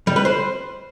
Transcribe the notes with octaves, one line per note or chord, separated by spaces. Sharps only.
G3
B4
C5